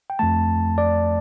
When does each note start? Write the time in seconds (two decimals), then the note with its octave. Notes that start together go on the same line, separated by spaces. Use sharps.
0.10 G5
0.19 F2 F3 A3 A5
0.78 D5